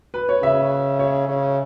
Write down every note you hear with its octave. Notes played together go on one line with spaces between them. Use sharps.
B4
C#5
C#3 E5
C#5
C#3